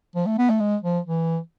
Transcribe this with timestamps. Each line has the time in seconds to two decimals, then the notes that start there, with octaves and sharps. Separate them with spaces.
0.15 F3
0.26 A3
0.38 B3
0.50 A3
0.60 G#3
0.83 F3
1.06 E3